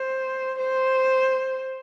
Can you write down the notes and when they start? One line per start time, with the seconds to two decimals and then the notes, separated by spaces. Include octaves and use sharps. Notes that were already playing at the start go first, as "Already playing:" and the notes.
Already playing: C5
0.59 C5